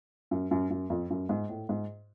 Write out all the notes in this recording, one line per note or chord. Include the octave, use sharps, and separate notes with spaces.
F#2
F#2
F#2
F2
F#2
G#2
A2
G#2